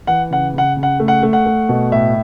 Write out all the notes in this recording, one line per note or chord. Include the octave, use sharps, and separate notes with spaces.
E3 F#5
C#3 F#5
C#3 F#5
C#3
F#5
A3
F#5
A3
F#5
A3
B2
A2 E5